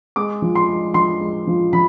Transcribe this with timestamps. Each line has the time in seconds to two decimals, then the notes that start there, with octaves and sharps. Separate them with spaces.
0.16 G#3 D6
0.42 F3
0.55 C6
0.69 G#3
0.94 F3 C6
1.21 G#3
1.47 F3
1.73 F3 B5